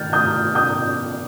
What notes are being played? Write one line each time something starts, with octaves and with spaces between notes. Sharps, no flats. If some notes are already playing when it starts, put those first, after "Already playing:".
Already playing: D#3 F6 G6 A6
D#6 G6
D#6 G6